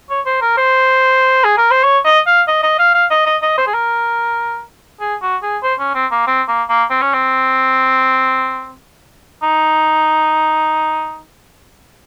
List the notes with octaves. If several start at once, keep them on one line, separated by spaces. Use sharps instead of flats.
C#5
C5
A#4
C5
G#4
A#4
C5
C#5
D#5
F5
D#5
D#5
F5
F5
D#5
D#5
D#5
C5
G#4
A#4
G#4
F#4
G#4
C5
C#4
C4
A#3
C4
A#3
A#3
C4
C#4
C4
D#4